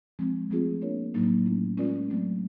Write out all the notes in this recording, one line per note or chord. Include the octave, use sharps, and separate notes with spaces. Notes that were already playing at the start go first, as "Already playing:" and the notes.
F3 G#3 C4
F3 A3 C4 F4 G#4
A#3 D4 F4 A#4 C#5
A2 F#3 A#3 D#4
F#3 A3 C#4 E4
G#3 C#4 F4 A#4 D5
F#3 A3 C4